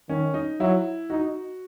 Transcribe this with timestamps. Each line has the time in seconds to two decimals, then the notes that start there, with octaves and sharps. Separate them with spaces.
0.09 D#3 C#4
0.34 D#4
0.60 F#3 E4
1.10 D#4 F#4